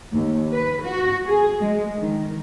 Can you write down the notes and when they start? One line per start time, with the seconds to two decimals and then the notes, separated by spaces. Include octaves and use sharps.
0.11 D#2
0.51 B4
0.81 F#4
1.27 G#4
1.60 G#3
1.95 D#3